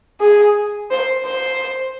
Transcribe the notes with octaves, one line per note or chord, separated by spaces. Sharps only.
G#4
C5
C5